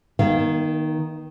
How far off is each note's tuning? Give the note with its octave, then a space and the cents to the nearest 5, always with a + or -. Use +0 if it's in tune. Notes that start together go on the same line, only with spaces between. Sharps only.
D#3 +0 B3 -40 F5 -30